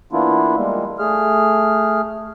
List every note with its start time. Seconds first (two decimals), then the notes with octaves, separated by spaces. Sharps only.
0.12 E3 A#3 B3 D4 E4 F4
0.56 G3 G#3 A#3
0.99 A3 G#4 F6